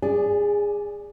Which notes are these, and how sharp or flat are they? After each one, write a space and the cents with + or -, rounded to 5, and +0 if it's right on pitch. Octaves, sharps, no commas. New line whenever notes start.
G#4 -20 D5 +0 G#5 +15